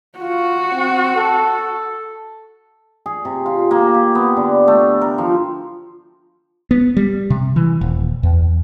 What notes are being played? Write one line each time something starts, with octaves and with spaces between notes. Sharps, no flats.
F4 F#4
C4
A4
G#4
C3
F4
A#3
G4
B3
D3
A3
A#4
F3
B3
G3
C3
E3
D#1
E2